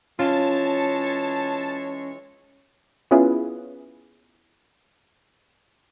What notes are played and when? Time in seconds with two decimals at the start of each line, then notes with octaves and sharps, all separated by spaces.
0.19 E3 G#3 C#4 F4 C#5 A5
3.11 B3 C#4 E4 F4 G#4 B4